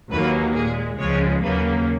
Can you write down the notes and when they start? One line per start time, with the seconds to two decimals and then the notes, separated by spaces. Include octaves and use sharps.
0.11 D#2 D#3 F#3 A#3 B4
0.55 A#2 G#3 G#4
0.99 C#2 C#3 F3 G#3 C#5
1.43 D#2 C#3 F#3 A#3 B4